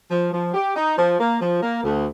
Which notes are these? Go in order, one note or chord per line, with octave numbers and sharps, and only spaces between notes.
F3
F3
G4
D#4
F3
A#3
F3
A#3
D2